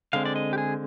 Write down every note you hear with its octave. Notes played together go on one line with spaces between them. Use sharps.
D3 G#3 C4 F5
D5
D#5
G4
G#4